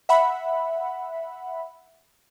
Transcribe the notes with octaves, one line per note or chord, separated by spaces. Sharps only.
E5 F#5 B5